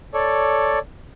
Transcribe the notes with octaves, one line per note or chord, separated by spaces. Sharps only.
A4 C#5 D5